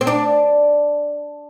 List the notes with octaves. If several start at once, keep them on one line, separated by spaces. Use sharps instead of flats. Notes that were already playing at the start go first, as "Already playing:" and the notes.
C4
D4